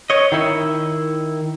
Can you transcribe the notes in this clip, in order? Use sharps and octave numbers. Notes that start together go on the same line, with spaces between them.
C#5 D#5
D#3 E4